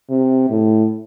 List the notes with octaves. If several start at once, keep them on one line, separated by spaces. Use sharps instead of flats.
C3
A2